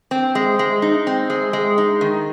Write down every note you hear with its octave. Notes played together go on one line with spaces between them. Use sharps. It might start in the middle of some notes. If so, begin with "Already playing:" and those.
C4
G#3
G#3
D#4
C4
G#3
G#3
D#4
D#3